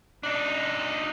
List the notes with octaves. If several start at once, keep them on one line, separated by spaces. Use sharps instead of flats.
D4 D#4